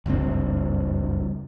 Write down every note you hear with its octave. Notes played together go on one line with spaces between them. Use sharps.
F#1 C#2 G2 C4